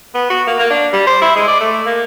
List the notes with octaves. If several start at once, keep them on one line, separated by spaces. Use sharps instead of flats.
B3
F#4
A#3
A#3
D4
G3
C5
E4
G#3
D5
A3
A#3